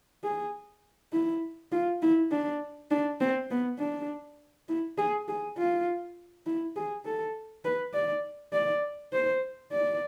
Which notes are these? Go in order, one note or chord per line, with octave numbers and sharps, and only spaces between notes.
G#4
E4
F4
E4
D4
D4
C4
B3
D4
E4
G#4
G#4
F4
E4
G#4
A4
B4
D5
D5
C5
D5